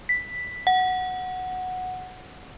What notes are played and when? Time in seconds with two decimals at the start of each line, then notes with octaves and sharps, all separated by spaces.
0.09 B6
0.67 F#5